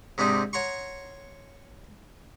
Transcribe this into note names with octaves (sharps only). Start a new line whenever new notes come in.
G#2 C3 C4 D4 D#4
C#5 F#5 A#5 C6 C#6